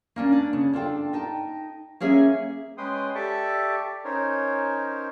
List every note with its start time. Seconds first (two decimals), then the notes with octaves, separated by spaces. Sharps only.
0.16 A#3 C#4 D4
0.32 D4
0.53 C#3
0.73 D4 F4 A4 G5
1.13 D#4 G5 A5
2.00 A#3 C#4 G#4 C#5 E5
2.78 G#3 C#4 B4 G5 C6 D#6
3.15 G4 A4 D5 E5 C#6
4.05 C#4 D#4 A#4 C5 C#5